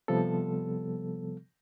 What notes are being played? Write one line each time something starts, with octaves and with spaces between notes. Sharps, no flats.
C3 F3 G3 B3 A4